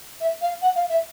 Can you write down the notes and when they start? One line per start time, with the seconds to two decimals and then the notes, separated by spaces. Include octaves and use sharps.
0.20 E5
0.41 F5
0.62 F#5
0.75 F5
0.89 E5